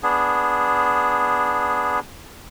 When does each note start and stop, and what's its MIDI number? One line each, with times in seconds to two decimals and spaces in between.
0.03 2.00 59
0.03 2.00 62
0.03 2.00 68